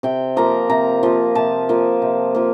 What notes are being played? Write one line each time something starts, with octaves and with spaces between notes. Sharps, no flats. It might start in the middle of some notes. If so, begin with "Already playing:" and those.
C3 G5
F3 A#3 A#5
C3 A#5
F3 A#3
C3 A5
F3 A#3
C3
F3 A#3